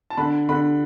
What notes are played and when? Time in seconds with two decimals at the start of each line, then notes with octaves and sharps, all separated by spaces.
0.10 A5
0.17 D3 B5
0.49 D3 B5